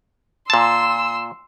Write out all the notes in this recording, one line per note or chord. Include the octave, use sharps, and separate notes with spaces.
A#2 A5 C6 E6